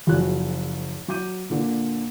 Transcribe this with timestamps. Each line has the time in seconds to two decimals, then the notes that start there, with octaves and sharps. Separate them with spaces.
0.07 F#1 F#2 F3 F#4 G#4 F#6
1.08 F#3 D6 G6 D#7
1.50 A#2 D3 A#3